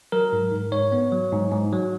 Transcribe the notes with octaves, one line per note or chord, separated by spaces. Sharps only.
F#3 A#4
G#2
G#2
G#2 C#5
B3
F#3
G#2
G#2
F#3